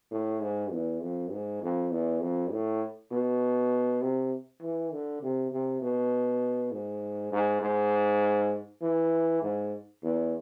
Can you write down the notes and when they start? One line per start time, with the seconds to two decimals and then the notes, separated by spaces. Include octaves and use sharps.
0.11 A2
0.42 G#2
0.72 E2
1.02 F2
1.32 G#2
1.62 F2
1.92 E2
2.21 F2
2.51 A2
3.12 B2
4.02 C3
4.61 E3
4.92 D3
5.22 C3
5.51 C3
5.82 B2
6.71 G#2
7.32 G#2
7.62 G#2
8.82 E3
9.42 G#2
10.03 E2